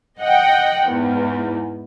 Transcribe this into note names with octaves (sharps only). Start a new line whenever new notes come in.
D#5 F#5 G5
E2 G#2